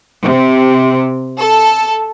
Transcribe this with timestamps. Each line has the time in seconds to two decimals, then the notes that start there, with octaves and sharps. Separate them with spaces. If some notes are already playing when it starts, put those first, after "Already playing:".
0.24 C3
1.39 A4